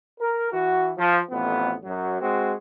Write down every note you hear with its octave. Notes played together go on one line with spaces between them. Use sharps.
A#4
E3 F#4
F3
A1 F2 B3
F#2 F#3
G#3 C4 F#4